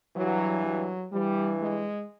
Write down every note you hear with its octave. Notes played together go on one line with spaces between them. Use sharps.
G2 E3 F#3
F#3
G2 E3 G3
G#3